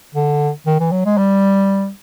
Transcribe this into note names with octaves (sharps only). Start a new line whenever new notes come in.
D3
D#3
E3
F#3
G#3
G3